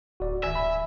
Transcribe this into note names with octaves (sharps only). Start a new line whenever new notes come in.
D1 F#4 D5
G#1 E5 G#5
B5